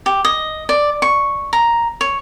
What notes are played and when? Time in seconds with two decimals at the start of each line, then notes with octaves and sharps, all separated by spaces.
0.06 G4
0.25 D#5
0.69 D5
1.02 C#6
1.53 A#5
2.01 C#5